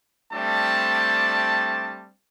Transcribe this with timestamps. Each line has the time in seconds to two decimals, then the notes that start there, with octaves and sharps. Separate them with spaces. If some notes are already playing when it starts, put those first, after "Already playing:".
0.34 G3 A3 C4 D4 A5